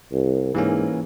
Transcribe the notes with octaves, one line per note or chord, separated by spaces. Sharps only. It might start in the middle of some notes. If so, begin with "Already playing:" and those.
C2
G#2 E3 A#3 C#4